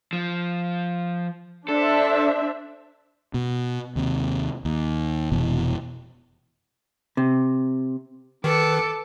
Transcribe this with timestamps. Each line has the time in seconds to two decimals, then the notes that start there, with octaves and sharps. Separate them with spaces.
0.13 F3
1.69 D4 A4 C5 E5
3.34 B2
3.96 D#2 C3
4.65 D#2
5.32 F1 B2 E3
7.17 C3
8.44 D#3 A4 B4 D6 C#7